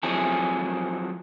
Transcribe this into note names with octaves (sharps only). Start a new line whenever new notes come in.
F3 F#3 C4 E4 G#4 A4